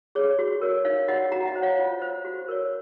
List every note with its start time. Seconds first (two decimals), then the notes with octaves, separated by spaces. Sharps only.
0.15 G#4 C#5
0.39 F#4
0.61 A#4 C#5
0.85 D#4 C#5 F5
1.08 F#4 C#5 D#5 F#5
1.32 F#4 F#5 A#5
1.47 D#5 F#5
1.55 C5
1.62 C#5 F5
1.78 F4
2.02 C5
2.25 F#4
2.48 A#4 C#5